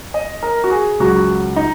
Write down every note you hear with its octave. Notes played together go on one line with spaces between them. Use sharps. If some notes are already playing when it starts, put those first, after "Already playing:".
D#5
A#4
F#4
G#4
C#2 C#3 F#3 F#4
D#4